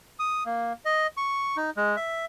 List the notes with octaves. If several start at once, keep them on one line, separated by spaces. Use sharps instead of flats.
D#6
A#3
D#5
C#6
D#4
G#3
E5